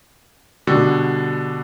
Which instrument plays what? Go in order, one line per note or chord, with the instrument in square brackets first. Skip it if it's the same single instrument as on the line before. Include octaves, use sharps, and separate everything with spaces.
[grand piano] B2 D3 G3